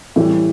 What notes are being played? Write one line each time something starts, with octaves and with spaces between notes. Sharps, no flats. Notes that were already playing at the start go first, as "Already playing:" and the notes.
A2 E3 G3